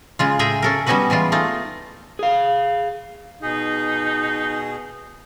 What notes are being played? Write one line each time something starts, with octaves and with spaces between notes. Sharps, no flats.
C#3 G#3 F4
A2 G#4 E5 G5 G#5 A#5
C#4 A4 A#4
G3 B3 C#4 D#4 F#4 B4
E3 G3 G#3 F4
A3 D#4 F4
G#4 F5
B2 D#4 G#4